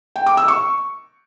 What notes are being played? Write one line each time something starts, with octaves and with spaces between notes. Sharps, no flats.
G5
D6
E6
C#6